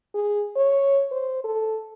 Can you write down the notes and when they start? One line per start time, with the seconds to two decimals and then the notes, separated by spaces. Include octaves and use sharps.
0.15 G#4
0.56 C#5
1.12 C5
1.44 A4